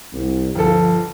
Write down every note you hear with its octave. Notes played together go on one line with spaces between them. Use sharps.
C2
G1 F3 A4